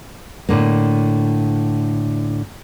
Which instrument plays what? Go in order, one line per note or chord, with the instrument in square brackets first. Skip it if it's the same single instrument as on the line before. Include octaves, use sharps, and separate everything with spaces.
[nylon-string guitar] A2 D3 A#3